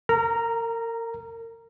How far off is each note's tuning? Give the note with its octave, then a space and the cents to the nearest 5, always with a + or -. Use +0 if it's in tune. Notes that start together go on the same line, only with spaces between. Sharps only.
A#4 -30 A#5 +0